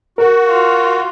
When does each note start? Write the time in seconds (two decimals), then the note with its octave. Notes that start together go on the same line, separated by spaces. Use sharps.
0.18 F#4 A#4
0.47 F4